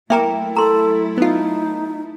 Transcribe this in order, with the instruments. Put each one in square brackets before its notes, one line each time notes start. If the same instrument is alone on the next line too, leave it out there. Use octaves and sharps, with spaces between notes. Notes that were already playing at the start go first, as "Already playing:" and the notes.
[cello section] F#3 A3 E4 [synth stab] A#3 A#4 [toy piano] E5 G5 A#5
[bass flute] A4 [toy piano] A#5 C6
[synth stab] B3 F4 [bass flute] D#4